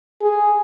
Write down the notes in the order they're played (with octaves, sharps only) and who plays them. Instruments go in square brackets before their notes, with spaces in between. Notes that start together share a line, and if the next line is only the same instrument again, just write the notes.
[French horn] G#4